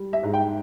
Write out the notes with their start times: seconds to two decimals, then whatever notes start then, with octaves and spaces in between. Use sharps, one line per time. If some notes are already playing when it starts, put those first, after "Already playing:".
Already playing: G3
0.13 E5
0.23 G#2
0.34 G5